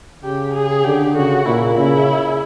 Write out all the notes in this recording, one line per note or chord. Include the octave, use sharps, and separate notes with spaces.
C#3 G4
G#4
D3 G4
C#3 F#4
A#2 E4
C#3 E4